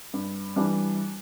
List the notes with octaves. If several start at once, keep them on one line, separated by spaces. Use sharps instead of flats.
G2
E3 G3 D4